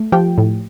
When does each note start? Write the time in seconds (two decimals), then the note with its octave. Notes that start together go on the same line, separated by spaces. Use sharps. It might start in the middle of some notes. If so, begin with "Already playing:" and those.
Already playing: A3
0.12 F3 G4 G5
0.38 A2